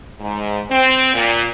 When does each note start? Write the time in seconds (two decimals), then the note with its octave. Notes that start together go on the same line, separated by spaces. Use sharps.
0.20 G#2
0.71 C4
1.14 A#2